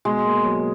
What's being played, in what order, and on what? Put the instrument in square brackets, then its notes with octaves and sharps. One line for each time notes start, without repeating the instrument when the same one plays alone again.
[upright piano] B2 [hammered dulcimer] G#3
[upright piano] A#3
F#3